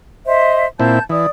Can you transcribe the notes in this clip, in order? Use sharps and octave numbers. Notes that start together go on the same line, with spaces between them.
C5 D#5 E5
A#2 C4 E4 A5 G6
E3 D5 D#6